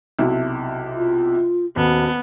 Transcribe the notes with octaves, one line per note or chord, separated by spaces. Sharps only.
B1 C3 E4
F4
D#1 B3 F#4